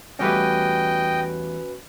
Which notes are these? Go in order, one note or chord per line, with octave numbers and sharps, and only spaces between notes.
E2 G3 A3 C#4 F#4 B4 D#5 G5